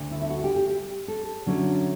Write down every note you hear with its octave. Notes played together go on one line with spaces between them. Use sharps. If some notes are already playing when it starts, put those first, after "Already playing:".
Already playing: D2 D3 A3
E4
E4
F#4
G4
G4
G4
A4
D3 F#3 C#4 E4